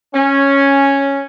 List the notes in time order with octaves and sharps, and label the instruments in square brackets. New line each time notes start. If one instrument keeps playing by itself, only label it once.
[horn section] C#4